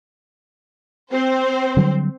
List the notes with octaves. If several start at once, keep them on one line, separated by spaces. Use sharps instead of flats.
C4 C5
D3 F#3 G3